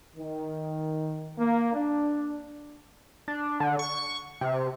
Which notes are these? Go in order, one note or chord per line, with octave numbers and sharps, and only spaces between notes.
D#3
A#3
D4
D4
D3
C#6
C3